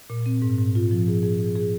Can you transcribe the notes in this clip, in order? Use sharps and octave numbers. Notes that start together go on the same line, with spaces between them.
A#2
C4
G#2
G#2
F4
F3
G#4
G#4
G#4
G#4